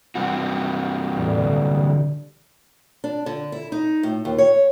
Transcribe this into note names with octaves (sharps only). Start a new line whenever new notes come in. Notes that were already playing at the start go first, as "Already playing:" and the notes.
G2 C3 F#4
E2 A2 G3
B1 D3
D4
D3
E4
D#4
A2
D#2
C#5